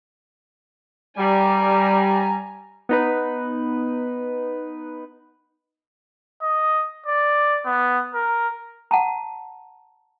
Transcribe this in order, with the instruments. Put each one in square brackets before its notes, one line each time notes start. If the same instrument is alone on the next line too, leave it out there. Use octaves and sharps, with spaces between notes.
[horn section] G3 [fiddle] G#5 A#5
[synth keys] B3 D#4 B4
[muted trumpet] D#5
D5
B3
A#4
[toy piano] F#5 A5 A#5